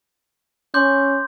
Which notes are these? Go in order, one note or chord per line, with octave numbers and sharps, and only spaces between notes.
C#4 C6 D6 G6